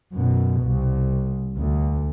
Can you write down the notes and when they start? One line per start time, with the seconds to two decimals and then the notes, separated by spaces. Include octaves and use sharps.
0.14 F#2 B2
0.62 C2
1.58 D2